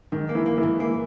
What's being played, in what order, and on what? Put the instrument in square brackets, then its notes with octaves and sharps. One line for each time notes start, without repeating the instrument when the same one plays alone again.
[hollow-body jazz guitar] G#2 [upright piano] D#3
[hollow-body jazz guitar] A#3
[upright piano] E3
[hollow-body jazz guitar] A#3
[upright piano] E3
[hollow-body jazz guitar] G#2
[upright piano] E3 [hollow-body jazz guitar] A#3